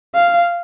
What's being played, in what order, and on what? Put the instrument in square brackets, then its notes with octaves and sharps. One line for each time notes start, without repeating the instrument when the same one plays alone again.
[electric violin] F5